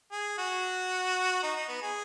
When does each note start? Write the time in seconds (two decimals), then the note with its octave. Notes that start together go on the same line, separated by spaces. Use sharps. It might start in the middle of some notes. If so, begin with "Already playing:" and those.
0.12 G#4
0.38 F#4
1.43 D#4
1.56 D#4
1.69 B3
1.82 G#4